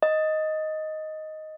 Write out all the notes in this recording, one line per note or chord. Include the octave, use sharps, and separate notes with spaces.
D#5